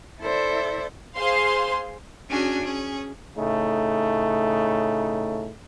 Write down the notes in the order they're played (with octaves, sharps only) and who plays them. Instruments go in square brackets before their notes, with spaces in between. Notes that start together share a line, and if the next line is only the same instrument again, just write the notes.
[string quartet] E4 A4 C5 D5 E5
[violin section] G#4 C5 F5 C6
[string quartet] C#4 D4 F#4 G#4 G#5
C#4 G#4
[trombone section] A2 C#3 A3 D#4